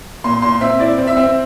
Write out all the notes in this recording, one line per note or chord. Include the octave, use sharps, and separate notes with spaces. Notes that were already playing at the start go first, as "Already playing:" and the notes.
A#2 C6
A#2 C6
C4 E5
E4 D5
C4
E5
C4